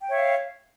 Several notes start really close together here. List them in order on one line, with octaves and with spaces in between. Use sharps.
G5 C#5 E5 F5